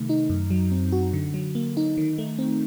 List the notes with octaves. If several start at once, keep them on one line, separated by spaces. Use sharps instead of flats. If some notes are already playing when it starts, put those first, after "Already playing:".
Already playing: C3 D#3 A3
D#4
F#2
F#3
C4
F#4
D3
F#3
A#3
D#4
D#3
A3
C4